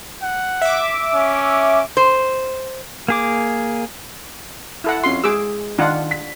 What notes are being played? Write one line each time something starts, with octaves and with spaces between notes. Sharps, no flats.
F#5
E5 D6
C#4
C5
A#3 G#4 D6
E4 A4 F#5
F2 C#4 F4 C6
G#3 G#4 D6 E6
D#3 D4 F4 F#5
B6